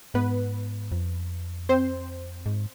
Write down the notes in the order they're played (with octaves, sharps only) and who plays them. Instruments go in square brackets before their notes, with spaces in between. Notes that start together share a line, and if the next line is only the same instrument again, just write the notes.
[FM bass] G#2 [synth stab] B3 B4
[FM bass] F2
[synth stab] C4 C5
[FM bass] G#2